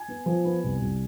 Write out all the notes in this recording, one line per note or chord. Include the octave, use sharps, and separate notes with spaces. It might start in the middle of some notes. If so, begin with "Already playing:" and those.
Already playing: G#5
B3
F3
B3
C2
C2